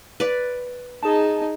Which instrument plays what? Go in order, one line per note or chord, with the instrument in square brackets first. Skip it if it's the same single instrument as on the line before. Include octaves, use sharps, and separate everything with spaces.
[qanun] B4 D5
[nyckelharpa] D#4 D#5 [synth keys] G#4 A5